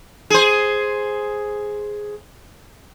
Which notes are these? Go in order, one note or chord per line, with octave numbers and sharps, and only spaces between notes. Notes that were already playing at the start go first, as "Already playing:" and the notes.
G#4 C5